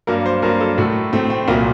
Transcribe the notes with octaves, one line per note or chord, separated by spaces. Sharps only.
G2 F#3 A#3 A#4
C5
G2 F#3 A#3 A#4
A4
A2 A3 F#4
A2 A3 C4
C4
C2 A#2 F#3 A#3 A#4